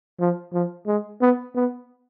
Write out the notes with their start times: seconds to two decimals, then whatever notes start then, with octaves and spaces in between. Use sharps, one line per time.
0.20 F3
0.53 F3
0.87 G#3
1.21 B3
1.55 B3